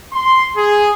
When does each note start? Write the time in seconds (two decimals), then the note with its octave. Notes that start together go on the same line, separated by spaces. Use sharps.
0.13 C6
0.57 G#4